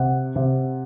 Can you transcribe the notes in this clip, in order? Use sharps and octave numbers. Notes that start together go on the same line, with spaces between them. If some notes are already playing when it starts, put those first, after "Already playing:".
Already playing: C3 F#5
C3